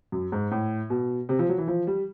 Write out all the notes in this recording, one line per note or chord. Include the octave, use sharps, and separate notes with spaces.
F#2
G#2
A2
B2
C3
F3
F#3
E3
F3
G3